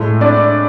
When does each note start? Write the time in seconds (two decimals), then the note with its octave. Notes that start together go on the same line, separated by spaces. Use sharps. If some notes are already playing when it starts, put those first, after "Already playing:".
Already playing: A2 G#3
0.21 D4 D5